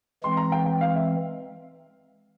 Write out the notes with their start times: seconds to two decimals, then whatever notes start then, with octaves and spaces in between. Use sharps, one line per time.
0.24 E3 G#3 C4 C6
0.37 A#5
0.52 G5
0.66 G5
0.81 F5
0.96 E5